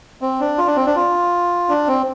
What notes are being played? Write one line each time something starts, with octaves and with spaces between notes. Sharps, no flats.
C4
D4
F4
D4
C4
D4
F4
D4
C4